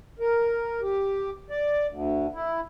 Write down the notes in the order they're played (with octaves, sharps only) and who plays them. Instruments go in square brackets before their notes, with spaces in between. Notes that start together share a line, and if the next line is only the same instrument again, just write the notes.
[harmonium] A#4
G4
D5
D2
E4